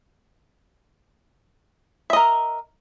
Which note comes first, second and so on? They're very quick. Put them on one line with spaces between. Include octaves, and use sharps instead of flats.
E5 D#5 A#4